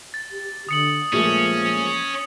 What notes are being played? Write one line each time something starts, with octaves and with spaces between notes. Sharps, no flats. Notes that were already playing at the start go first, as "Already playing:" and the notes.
A6
G4
D3 D#6 C#7 F#7
A#2 F3 G#3 A3 C#4